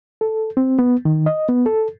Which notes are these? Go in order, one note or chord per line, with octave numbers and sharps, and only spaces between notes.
A4
C4
B3
D#3
D#5
B3
A4